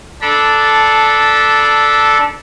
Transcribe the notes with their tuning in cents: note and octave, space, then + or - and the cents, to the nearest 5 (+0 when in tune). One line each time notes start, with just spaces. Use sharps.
D4 +0 A4 -5 B5 -35